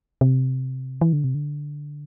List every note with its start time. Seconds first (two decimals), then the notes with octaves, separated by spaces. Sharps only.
0.21 C3
1.01 E3
1.13 D3
1.24 C3
1.35 D3